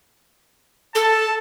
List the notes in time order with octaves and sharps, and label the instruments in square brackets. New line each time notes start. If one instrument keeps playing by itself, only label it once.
[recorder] A4 [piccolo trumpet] A5